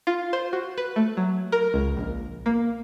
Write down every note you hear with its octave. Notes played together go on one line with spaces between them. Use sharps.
F4
C5
F#4
B4
A3
F#3
A#4
C#2
A#1
A#3